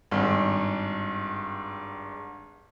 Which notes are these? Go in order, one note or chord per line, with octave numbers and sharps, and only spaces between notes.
G#1 G2